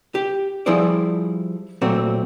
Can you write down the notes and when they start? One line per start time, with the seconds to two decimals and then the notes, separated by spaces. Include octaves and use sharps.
0.15 G4
0.66 F3 G3 E4 G#4 C5 D5
1.82 A#2 F#3 A3 C4 F#4